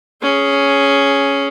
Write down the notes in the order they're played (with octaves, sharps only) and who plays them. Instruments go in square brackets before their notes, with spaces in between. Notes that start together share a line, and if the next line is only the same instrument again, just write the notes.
[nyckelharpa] C#4 G#4